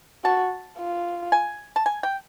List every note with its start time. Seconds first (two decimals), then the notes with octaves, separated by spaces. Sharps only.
0.24 F#4 A5
0.78 F4
1.32 G#5
1.76 A5
1.86 G#5
2.03 G5